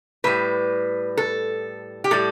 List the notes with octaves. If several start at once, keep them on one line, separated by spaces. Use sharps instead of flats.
A2 G3 B4
A4
G4
A2 G3 A4